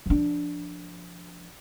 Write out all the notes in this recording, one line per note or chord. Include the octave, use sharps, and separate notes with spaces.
F3 D4